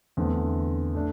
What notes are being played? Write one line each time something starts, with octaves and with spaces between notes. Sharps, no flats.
E2 D3 A3 C4
D3 A3 D4